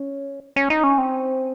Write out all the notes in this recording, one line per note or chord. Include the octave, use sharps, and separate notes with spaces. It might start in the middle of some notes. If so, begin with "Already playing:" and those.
Already playing: C#4
C#4
D#4
C#4
C4